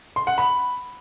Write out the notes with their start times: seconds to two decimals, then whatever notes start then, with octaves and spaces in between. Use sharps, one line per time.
0.16 C6
0.27 F#5
0.38 B5